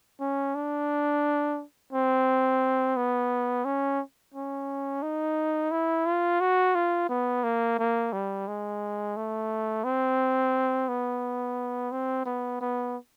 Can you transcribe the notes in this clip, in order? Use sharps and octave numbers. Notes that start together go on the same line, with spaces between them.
C#4
D4
C4
B3
C#4
C#4
D#4
E4
F4
F#4
F4
B3
A#3
A#3
G3
G#3
A3
C4
B3
C4
B3
B3